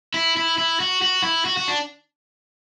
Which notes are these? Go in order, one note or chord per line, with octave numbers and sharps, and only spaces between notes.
E4
E4
E4
F#4
F#4
E4
F#4
F#4
D4